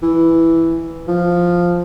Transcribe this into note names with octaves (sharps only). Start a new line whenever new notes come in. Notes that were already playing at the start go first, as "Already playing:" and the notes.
E3
F3